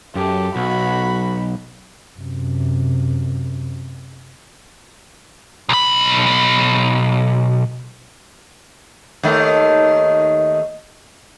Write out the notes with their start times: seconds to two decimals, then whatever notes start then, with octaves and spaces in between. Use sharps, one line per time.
0.15 F#2 G4 A4
0.56 B1 F#4 B5
2.19 F#2 C3
5.69 B1 B5
9.23 D#2 D#3 A3